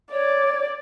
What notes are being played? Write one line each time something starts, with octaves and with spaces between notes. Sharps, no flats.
C#5 D5